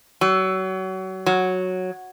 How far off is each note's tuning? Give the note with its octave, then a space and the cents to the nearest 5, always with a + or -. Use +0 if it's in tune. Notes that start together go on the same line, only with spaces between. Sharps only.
F#3 +30
F#3 -5